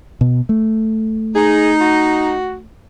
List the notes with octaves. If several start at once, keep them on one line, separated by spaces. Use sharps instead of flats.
B2
A3
D#4 G#4
F#4